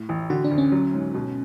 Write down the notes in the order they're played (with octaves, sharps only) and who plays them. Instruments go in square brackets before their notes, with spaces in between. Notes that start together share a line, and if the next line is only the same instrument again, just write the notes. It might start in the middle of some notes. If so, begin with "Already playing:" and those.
Already playing: [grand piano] A2
A1
[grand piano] D3 [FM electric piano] F#4
[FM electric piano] D4
[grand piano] D2
[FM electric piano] C#4
[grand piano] F#3
G#2
B2